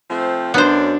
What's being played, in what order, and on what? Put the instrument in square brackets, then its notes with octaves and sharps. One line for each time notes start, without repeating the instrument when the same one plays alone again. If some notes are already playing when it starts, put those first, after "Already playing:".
[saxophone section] F3 A3 C4
[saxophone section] F#2 [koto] B3 C5 [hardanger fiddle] D4